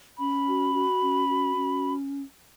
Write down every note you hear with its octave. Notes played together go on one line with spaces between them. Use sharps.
C#4 B5
F#4
F#4
C#4
F#4
C#4